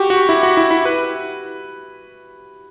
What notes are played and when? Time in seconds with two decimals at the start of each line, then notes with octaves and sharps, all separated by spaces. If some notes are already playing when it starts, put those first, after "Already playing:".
Already playing: F#4 G4
0.10 F#4
0.29 E4
0.43 F#4
0.57 E4
0.71 E4
0.85 B4